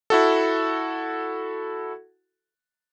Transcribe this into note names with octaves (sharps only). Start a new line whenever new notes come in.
E4 F#4 A4